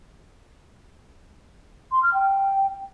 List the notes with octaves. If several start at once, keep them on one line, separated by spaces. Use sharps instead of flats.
C6
F6
G5